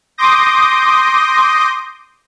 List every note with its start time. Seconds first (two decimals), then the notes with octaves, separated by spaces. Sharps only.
0.18 C6 D6 D#6 G6 A#6